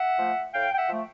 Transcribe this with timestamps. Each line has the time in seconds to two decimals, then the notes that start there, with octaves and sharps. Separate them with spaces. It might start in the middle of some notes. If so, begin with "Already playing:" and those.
Already playing: E5 F#5
0.19 F3 A3
0.53 A2 F5 G5
0.73 G5
0.77 E5 F#5
0.88 F3 A3